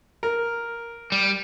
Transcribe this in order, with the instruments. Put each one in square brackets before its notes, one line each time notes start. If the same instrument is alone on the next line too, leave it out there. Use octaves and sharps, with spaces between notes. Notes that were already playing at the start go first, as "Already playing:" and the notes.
[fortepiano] A#4
[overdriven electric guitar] G3